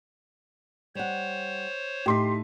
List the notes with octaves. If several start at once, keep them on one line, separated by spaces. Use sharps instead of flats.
G3 C5 C#5 F#5
A2 D#4 G4 C6 B6